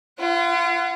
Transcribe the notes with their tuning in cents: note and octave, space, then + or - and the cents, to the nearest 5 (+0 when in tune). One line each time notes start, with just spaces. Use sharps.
F4 -35 F#5 +0